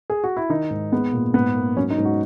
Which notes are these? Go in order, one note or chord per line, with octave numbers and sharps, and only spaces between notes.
G#4
F#4
E4
D#3 D#4
G#2
G#3 B3
A#2
G#2 B3
A#3
F#3 C#4
D#4
G#2
F#4